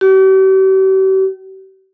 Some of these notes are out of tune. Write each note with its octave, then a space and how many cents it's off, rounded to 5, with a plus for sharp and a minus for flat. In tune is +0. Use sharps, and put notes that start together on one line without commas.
G4 -45